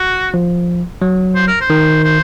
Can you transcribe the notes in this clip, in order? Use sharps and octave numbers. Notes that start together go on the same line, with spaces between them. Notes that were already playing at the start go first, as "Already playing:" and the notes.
Already playing: F#4
F3
F#3
C5
A#4
C5
D#3
C5